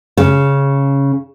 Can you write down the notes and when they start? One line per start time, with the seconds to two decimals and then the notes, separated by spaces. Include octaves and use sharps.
0.17 C#3